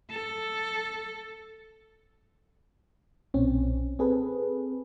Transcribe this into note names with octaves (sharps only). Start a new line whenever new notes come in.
A4
B1 A#2 C4 C#4
C4 G#4 A4 B4